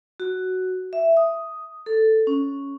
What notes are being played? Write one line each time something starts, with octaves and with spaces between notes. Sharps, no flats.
F#4
E5
D#6
A4
C#4